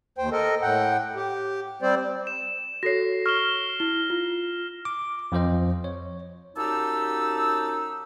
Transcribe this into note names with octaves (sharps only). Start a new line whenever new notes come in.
D#2 C5 G5
A4 A#4 D#5
A2 F#5 G5
G4
G3 C4 C5 D5
E7
F#4 A4 C#5 A#6 C7
C#6 F6 E7 G7
E4 G7
F4
D6
F2 F3 C5 D#5
C#5
F#2 D#4 G4 D5 A5 E6